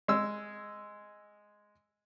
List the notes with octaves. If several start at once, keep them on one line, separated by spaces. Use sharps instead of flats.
G#3 E6